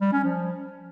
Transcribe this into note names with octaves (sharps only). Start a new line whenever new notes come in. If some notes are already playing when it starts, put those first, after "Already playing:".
G3
C#4
F3